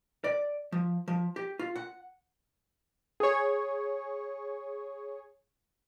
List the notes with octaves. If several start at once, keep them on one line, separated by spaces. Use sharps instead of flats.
D5
F3
F3
G4
F4
F#5
G#4 C#5